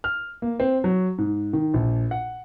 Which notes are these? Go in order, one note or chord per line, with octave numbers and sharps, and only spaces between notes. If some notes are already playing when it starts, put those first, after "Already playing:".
F6
A#3
C4
F#3
G#2
D#3
A#1
F#5